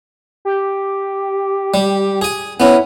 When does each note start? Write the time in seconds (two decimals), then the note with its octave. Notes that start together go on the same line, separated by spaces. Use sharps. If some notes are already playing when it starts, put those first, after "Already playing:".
0.45 G4
1.74 G3
2.22 G#4 G#5
2.60 B3 C#4 E4